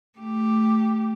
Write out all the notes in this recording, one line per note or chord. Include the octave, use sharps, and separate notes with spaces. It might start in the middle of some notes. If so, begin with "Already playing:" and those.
A3 G4